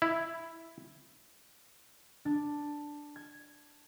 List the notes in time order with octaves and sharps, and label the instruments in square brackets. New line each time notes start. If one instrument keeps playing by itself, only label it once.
[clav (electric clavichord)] E4
[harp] D4
G#6